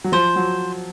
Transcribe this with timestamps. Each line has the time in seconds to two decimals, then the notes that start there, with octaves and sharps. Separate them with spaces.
0.04 F#3
0.12 F3 C5
0.36 F#3